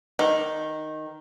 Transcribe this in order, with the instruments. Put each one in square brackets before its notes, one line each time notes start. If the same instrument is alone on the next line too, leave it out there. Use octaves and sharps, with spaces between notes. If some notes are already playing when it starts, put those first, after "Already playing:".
[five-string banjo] D#3